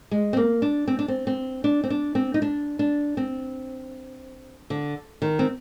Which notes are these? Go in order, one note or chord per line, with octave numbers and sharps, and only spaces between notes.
G#3
C4
A#3
D4
C4
D4
C4
C4
D4
C4
D4
C4
D#4
D4
D4
C4
D3
D#3
C4